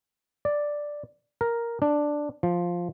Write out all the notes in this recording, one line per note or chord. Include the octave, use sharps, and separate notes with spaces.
D5
A#4
D4
F3